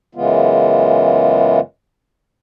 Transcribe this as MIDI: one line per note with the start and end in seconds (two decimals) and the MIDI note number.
0.15 1.60 42
0.15 1.60 49
0.15 1.60 52
0.15 1.60 56
0.15 1.60 59
0.15 1.60 65